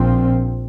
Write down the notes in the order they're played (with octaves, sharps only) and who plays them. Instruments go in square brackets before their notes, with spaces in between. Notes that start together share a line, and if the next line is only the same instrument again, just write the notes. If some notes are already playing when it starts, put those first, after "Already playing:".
Already playing: [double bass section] A#1 A#2 F3 C4